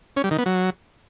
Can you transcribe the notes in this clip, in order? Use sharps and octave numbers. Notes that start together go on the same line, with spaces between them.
C#4
G3
D#3
B3
F#3